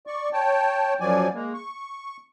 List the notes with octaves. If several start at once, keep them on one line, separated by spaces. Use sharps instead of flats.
D5 C#6
C#5 G5 A5
F#2 F3 F#3 D5 G#5
G#3 A#3
C#6